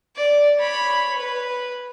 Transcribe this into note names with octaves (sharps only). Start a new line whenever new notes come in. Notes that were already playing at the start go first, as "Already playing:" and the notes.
D5
C#5 B5
B4